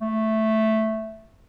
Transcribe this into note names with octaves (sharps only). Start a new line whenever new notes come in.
A3